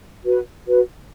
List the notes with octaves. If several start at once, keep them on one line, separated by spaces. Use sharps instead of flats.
F#4 B4
F#4 B4